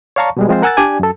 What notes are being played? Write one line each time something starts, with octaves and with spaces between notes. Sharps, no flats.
C#5 D5 F5 A5 A#5 C#6
B2 G3 G#3
F3 G#3 C4 F4 C5
A#4 F#5 G#5 E6 F#6 A6
D4 G4 D5 G#5
F#2 A4